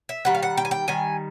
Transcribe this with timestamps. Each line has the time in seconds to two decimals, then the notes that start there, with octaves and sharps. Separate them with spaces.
0.09 E5
0.25 D#3 G3 F#5
0.35 F5
0.43 F#5
0.57 G5
0.65 G#5
0.71 G5
0.88 D#3 G3 G#5